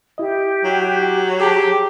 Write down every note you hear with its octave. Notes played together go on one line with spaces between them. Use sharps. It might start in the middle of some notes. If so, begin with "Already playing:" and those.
E4 G4 D#5
F#3
G4 G#4 A5 A#5